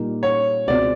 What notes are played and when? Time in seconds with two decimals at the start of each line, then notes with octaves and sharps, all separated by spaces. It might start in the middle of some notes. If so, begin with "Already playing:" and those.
Already playing: A#2 G3 A#3 D#4
0.23 C#5
0.68 C#2 B2 G#3 C4 D5